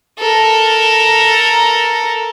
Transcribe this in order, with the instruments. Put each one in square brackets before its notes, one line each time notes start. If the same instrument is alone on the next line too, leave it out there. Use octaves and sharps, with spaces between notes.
[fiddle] A4 A#4